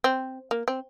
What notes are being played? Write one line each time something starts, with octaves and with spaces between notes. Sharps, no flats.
C4
A#3
C4